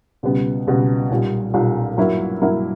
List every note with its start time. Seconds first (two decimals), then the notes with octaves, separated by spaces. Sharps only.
0.23 C#2 B2 G3 B3
0.67 C#2 B2 G3 B3
1.11 B1 A#2 G3
1.54 B1 A#2 G3
1.97 G2 F#3 A#3 E4 A#4
2.41 G2 F#3 A#3 E4 A#4